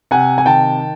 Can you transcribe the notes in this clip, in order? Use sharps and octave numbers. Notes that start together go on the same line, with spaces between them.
C3 F#5 G#5
G#5
D#3 G5 A5